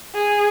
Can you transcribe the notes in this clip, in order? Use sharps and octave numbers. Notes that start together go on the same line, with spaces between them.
G#4